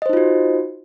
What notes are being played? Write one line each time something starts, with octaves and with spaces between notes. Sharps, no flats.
D#4 F4 F#4 C5 D#5